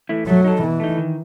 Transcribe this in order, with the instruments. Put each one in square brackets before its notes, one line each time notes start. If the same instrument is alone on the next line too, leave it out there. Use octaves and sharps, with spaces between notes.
[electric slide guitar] E3 A3 E4
[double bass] F#3 [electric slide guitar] A3
[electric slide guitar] D#4 A4
[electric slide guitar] B2 [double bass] E3
[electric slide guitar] A3 D#4
D#3